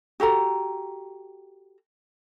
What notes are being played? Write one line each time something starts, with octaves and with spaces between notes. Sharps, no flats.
F#4 G4 A4 A#5